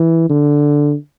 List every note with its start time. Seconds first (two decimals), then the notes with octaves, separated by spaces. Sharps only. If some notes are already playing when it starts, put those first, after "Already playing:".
Already playing: E3
0.29 D3